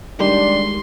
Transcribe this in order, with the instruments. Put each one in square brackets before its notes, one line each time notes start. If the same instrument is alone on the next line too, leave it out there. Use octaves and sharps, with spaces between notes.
[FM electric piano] D#3 G3 G4 [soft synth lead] G#3 [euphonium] D4 [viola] C6